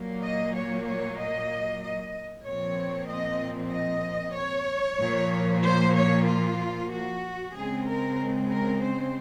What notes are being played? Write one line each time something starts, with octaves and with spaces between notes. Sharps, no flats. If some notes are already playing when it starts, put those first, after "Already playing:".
Already playing: A#2 F#3 A#3
D#5
C#5
C#5
D#5
D#5
A#2 F3 C4 C#5
D#5
D#5
C#5
A#2 F3 A#3
C5
C#5
F4
F#4
C#3 G#3 C4 G#4
A#4
A#4
C5